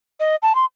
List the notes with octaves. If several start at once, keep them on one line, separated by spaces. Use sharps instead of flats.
D#5
A5
C6